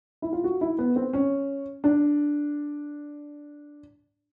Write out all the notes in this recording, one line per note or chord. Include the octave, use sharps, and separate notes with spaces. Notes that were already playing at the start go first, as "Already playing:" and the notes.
E4
F4
F#4
E4
B3
C4
C#4
D4